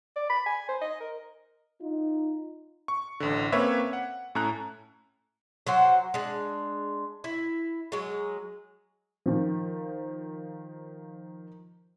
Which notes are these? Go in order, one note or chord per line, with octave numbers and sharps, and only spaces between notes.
D5
B5
G#5
C5
D#5
A#4
D#4 F4
C#6
A1 D3
A#3 C4 C#4 B4 C#5 E5
F#5
A2 C#4 A4 A#5 F#6
F#3 C5 F#5
G#3 D4
E4
F#3 G#3
D#3 F3